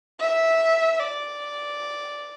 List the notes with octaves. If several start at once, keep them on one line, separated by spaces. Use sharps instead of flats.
E5
D5